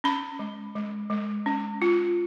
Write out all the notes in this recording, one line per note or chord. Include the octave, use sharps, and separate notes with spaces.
C#4 B5
G#3
G#3
G#3
C#4
F4